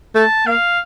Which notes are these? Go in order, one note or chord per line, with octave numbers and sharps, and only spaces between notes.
A3 A5
A#3 F5